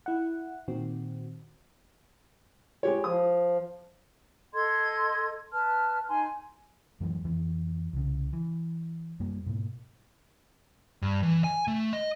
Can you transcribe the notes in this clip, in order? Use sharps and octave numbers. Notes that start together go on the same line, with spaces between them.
E4 F#5
A#2 D#3 C4 F#4
G#3 G4 C#5
F3 D#6
A4 D#5 C6 G#6
B4 A5 F6
D#4 G#5 C6
F#2 E3 F#3 G#3
F2 E3
C2 C#3
E3
F#2 G3 A#3
G#2 B2 A#3
G2
E3
G#5
A3
D#5